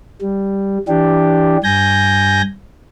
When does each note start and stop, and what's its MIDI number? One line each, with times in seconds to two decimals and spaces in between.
0.21 0.78 55
0.88 1.57 52
0.88 1.57 62
0.88 1.57 67
1.64 2.42 43
1.64 2.42 80
1.64 2.42 91
1.64 2.42 94